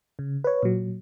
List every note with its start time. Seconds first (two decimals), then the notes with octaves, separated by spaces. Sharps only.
0.19 C#3
0.44 B4 C#5
0.63 A#2 F#3